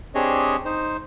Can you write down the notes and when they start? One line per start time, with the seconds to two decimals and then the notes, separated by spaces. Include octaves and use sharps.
0.15 C4 D4 G4 G#4 C#5 D#5
0.65 D#4 C5